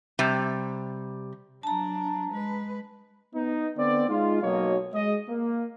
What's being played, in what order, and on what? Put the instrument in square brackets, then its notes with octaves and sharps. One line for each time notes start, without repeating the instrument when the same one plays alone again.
[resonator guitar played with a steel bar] C3 G3
[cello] F#3 D4 [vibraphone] A5 A#5
[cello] G#3 B4
[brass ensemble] B3 D#4
D3 B3 C4 D5
G#3 D#4 F4
B1 F#3 A#3 C#5 D#5
G#3 D#5
A#3